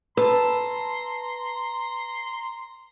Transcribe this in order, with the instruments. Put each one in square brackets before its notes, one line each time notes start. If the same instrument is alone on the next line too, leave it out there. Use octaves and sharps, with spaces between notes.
[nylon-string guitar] B4 [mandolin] A5 E6 [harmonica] A#5 C6